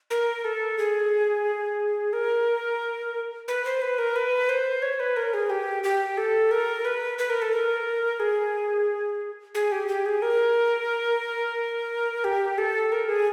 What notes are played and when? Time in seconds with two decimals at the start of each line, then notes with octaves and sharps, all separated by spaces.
0.10 A#4
0.44 A4
0.78 G#4
2.13 A#4
3.48 B4
3.65 C5
3.82 B4
3.98 A#4
4.16 B4
4.49 C5
4.82 C#5
5.00 B4
5.17 A#4
5.34 G#4
5.50 G4
5.84 G4
6.17 A4
6.51 A#4
6.85 B4
7.18 B4
7.30 A#4
7.42 A4
7.53 A#4
8.20 G#4
9.55 G#4
9.72 G4
9.88 G4
10.06 G#4
10.22 A#4
12.24 G4
12.58 A4
12.92 A#4
13.09 G#4